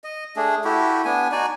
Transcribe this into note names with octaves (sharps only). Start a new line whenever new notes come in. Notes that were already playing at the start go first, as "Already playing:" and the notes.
D#5
A3 D4 G#4
A3 E4 F#4 G4
B3 D4 G#5
D#4 F#4 D5 G#5